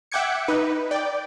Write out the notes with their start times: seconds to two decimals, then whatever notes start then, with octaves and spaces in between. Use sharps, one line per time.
0.12 E5 F#5 G5 D6 G#6 C#7
0.48 D#4 B4
0.91 D5 G5